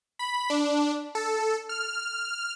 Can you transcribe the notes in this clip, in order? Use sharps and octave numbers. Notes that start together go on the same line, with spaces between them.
B5
D4
A4
F6